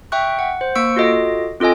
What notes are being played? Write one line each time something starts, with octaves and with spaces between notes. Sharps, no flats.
E5 G5 C#6 F#6
F#5
C5
A#3 C#6 E6 C#7 D7
F4 F#4 A4 D#5
C4 F4 A4 D#5 G#5